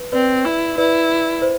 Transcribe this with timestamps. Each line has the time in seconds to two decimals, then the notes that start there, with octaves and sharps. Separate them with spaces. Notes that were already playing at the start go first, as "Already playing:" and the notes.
Already playing: B4
0.13 C4 B4 D5
0.45 E4
0.78 E4 B4 D5
1.42 C5